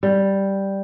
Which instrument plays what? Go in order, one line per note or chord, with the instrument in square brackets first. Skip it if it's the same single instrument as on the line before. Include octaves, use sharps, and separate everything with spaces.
[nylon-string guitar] G3